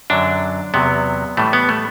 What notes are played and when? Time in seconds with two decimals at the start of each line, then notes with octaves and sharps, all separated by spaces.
0.10 F#2 D3 F#3 D4
0.74 E2 C3 F#3 B3
1.37 A2 E3 G3 A3
1.53 B3
1.69 A3